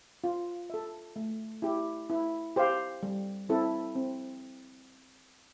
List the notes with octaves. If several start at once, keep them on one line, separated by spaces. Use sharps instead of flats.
F4
A4 E5
A3
E4 G4
E4
G4 C5 F5
G3
C4 E4 A4
C4